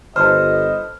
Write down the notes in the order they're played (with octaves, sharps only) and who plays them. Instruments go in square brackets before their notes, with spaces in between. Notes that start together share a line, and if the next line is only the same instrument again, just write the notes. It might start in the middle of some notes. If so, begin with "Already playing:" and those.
[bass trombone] G1 [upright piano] A4 B4 C5 [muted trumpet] D#5 [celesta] F6